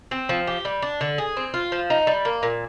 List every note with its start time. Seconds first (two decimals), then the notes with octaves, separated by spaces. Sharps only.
0.11 C4
0.29 F3
0.47 G4
0.65 G3
0.82 D4
1.01 D3
1.18 G#4
1.37 C4
1.54 F4
1.72 F3
1.90 D#4
2.07 G3
2.25 A#3
2.43 A#2